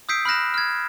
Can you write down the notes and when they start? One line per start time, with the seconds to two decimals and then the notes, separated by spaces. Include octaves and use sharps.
0.09 D#6 E6 G6 B6 C7 D7
0.25 B5 F6 F#6 A#6 E7
0.54 F6 G#6